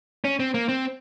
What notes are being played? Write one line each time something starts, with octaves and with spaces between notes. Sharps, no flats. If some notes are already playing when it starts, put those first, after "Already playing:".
C#4
C4
A#3
C4